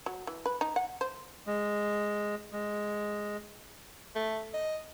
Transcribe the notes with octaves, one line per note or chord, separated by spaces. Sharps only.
F#3
E3
B4
D#4
F#5
C5
G#3
G#3
A3
D#5